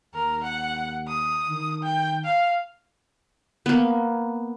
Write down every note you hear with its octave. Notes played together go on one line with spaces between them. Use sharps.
D#2 A#4
F#5
D#6
D#3
G5
F5
A#3 B3